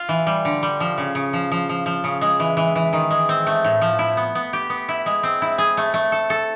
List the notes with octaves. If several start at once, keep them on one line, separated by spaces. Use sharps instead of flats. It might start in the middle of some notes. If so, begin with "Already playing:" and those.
Already playing: F4
E3
G3
D3
G3
F3
C#3
C#3
F3
F3
F3
F3
C#3
G#3
E3
E3
E3
D#3
G#3
C4
A3
A2
F3
E4
B3
B3
G4
B3
E4
G#3
C4
E4
G#4
A3
A3
A4
A4